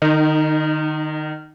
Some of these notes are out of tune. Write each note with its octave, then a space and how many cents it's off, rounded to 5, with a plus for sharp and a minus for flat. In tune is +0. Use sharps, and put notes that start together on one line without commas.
D#3 -35 D#4 +0